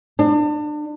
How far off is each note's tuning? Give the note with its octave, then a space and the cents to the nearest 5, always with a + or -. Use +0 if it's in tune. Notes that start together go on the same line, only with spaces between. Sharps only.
D4 +30